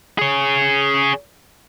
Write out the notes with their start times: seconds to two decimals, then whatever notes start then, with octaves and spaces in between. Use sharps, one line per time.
0.18 G#4 C#5